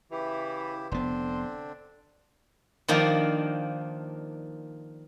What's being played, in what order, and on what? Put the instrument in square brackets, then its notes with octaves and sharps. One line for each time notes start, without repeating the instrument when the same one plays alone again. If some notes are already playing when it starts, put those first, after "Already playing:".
[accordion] C#3 E4 G4 [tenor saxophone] E3
[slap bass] F1 B3 [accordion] D3 C4 D4 [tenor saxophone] C5
[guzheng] D#3 F3 A#3 D4